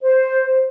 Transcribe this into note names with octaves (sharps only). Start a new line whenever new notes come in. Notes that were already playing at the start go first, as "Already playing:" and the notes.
C5